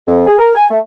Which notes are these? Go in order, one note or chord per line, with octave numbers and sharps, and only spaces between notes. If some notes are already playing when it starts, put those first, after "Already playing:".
F2
G#4
A#4
G#5
A3